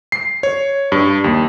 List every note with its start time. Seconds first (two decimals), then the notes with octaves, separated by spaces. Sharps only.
0.12 C7
0.43 C#5
0.92 G2
1.24 D#2